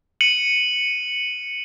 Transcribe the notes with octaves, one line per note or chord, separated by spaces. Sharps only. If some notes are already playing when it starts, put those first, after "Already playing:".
C#7 D#7 F#7